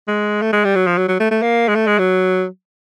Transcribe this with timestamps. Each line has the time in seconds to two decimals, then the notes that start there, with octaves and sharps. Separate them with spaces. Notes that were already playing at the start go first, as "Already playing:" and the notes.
0.08 G#3
0.41 A3
0.53 G#3
0.64 G3
0.75 F#3
0.87 F3
0.98 F#3
1.08 F#3
1.20 A3
1.31 A3
1.42 A#3
1.68 G#3
1.75 A3
1.87 G#3
1.98 F#3